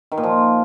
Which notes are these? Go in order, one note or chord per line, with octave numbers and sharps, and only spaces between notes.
D#3
A#2
F3